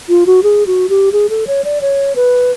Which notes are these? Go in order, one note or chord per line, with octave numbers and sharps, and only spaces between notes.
F4
F#4
G#4
F#4
G4
G#4
A4
C#5
D5
C#5
B4